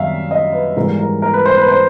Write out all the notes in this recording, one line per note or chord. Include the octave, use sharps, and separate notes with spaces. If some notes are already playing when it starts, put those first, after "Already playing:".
Already playing: F#2 D#3 G3 E5 F5
D#5
B4
G#2 E3 G3 A#4
A#4
A#4
B4
C5
B4
C5